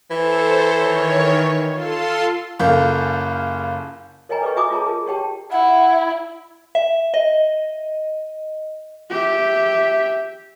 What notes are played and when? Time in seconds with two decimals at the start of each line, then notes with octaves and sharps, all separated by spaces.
0.10 E3 A4 C5
0.75 D#3 C#5
1.71 F4 A4 C6
2.59 F#1 C#3 F4 A4 G6
4.29 A#4 C#5 D#5 G5 G#5 A#5
4.42 A4 B4 D5 D#5 C#6
4.56 F#4 E5 G#5 A#5 D6 D#6
4.71 F4 G#4 C#5 A5 A#5
4.86 G#4 A#4
5.06 G4 C#5 G5 A5
5.51 E4 F#5
6.75 E5
7.14 D#5
9.10 G4 E5